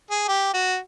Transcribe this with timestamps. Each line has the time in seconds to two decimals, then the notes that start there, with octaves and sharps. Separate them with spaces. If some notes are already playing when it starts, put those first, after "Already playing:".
0.11 G#4
0.28 G4
0.54 F#4